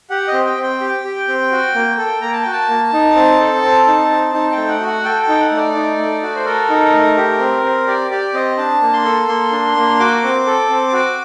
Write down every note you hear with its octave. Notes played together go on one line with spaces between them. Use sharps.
G4 F#5
D#5
C4
G5
C4
G5
G4
G4
C4
F#4
A#3
A4
A#3 A#5
A5
F#4 G5
A5
A#3
D#4
C4
A4
C4
D#4
C4
D#4 A5
G5
A3
F#5
F#4
F#5
A4 G5
G5
D#4
F#5
A3
D5
D#4
A3
F#4
C5
A4 A#4
D#4
A3
G4
C4
C4
G4 D5
G4 D5
C4 D#5
D4 A5
A#3
C6
A4
A#3 C6
D4
A#3
F#4 D6
C4
A4
C4
F#4